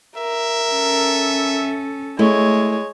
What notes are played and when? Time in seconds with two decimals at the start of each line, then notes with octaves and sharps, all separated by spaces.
0.17 A#4 E5
0.70 C#4 A4
2.19 G#3 A3 E4 C#5